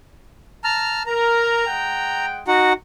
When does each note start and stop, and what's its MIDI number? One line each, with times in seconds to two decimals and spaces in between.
0.64 1.03 81
0.64 1.03 82
0.64 1.03 89
1.06 1.64 70
1.06 2.26 82
1.67 2.45 56
1.67 2.45 78
1.67 2.45 79
2.48 2.73 63
2.48 2.73 66
2.48 2.73 78